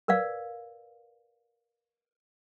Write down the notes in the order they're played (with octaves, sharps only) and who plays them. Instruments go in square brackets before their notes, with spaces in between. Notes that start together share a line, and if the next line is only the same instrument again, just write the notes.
[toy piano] A#4 B4 D5 F5